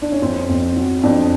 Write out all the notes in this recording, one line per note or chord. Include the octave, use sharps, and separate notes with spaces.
D4
C#4
F2 C4
F2
F#3
F2 D4